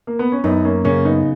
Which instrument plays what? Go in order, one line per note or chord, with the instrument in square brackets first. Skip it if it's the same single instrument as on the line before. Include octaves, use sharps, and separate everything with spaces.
[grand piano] A#3
B3
C#4
[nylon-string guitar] F#2 [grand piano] B3 D#4
[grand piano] A#3 C#4
[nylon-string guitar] C#3 [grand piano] A#3 C#4
[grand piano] B3 D#4